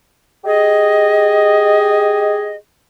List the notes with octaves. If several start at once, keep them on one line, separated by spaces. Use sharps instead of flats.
G4 G#4 D#5